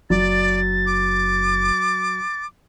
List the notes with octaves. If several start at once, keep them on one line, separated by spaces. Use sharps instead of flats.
F#1 F#3 D5 A6
D6